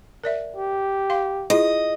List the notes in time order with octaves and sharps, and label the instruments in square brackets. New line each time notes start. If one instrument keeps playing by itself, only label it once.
[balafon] A#4 D5 E5
[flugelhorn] G4
[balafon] F5 C6
[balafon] E4 F4 G#4 [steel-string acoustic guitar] D#5